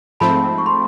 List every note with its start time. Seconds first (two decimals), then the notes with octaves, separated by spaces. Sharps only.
0.20 G#2 F3 A3 C4 A5 B5
0.58 C#6
0.66 C6